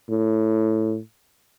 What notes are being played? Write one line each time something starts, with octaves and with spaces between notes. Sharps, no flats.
A2